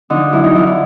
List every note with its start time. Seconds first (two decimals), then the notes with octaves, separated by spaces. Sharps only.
0.10 D3 F3 D#4
0.33 F#2 E4
0.44 D#4
0.55 D3 F3 E4
0.67 E4